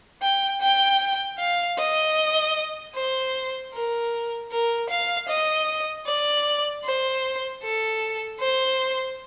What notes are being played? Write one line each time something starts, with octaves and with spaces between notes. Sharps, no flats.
G5
G5
F5
D#5
C5
A#4
A#4
F5
D#5
D5
C5
A4
C5